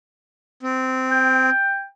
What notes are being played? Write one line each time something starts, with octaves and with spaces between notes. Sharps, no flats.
C4
G5